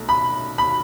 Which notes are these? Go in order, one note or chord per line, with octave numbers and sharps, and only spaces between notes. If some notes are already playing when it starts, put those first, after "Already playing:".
Already playing: B1 A3
B5
B5